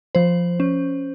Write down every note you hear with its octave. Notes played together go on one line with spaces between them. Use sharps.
F3 C5
C#4